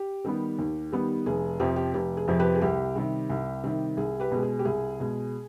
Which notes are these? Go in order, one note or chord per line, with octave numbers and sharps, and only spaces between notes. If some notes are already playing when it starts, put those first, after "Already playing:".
Already playing: G4
D#3 G3 B3
D#2
D#3 G3 B3
F1 G#4
F2 C3 F3 G4
G4
F1 G4
G#4
F2 C3 F3
G4 B4
G#4
C2 G4
C3 D#3 G3
C2
C3 D#3 G3
C2 G#4
G4 B4
B2 G#3
G#4
G4
C2 G#4
B2 G#3